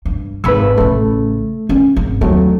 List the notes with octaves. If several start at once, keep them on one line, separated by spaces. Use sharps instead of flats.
G2
G#1 G#2 B4 B5 E6
A1 C#3 A3
C#4
G#1
D#2 F#3 A3 C4